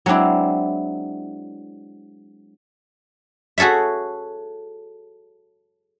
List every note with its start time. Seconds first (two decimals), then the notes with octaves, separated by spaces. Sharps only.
0.06 F#3 G#3 C4 D4 E4
3.58 F#4 G#4 A4 C#5 E5